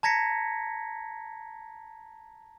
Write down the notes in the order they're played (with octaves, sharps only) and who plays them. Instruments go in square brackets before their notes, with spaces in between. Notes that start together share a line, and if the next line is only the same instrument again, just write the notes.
[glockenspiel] A5 A#5 G#6 A#6 B6 C#7